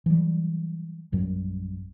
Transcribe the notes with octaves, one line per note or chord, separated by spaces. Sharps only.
E3 F#3 G3
A#1 F#2 F#3 G3